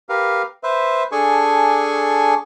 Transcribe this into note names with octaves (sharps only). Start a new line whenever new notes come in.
G4 A#4 B4 F5
B4 C5 E5
D4 G#4 A4 G#5 C#6